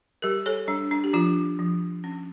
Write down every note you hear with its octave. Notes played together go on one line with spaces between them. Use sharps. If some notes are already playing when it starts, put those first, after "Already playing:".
G3 G4 A#4
A4 C#5
G3 D4
D4
G4
F3 D4 F4
F3
C#4